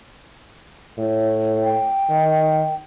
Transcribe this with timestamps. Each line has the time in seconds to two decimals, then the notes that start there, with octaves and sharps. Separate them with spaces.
0.98 A2
1.63 G5
2.10 D#3